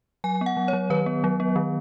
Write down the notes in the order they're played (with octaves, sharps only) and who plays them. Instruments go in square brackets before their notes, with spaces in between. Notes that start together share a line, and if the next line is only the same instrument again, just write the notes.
[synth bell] F#3 G#5
B3
F#5
F#3
C#5
F#3
D#3 B4
B3
F#3
B3
D#3